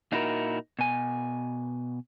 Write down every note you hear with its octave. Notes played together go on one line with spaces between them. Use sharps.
A#2 D#4 E4 F#4 A4 A#4
B2 G#5